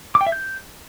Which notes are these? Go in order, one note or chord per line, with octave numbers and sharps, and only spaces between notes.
D6
G5
E5
G6